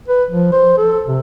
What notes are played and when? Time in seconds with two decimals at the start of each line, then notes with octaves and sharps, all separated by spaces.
0.08 B4
0.30 F3
0.53 C5
0.78 A4
1.08 C3